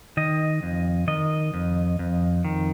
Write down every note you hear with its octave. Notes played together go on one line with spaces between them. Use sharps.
D#3 D#5
F2
D#3 D#5
F2
F2
D#3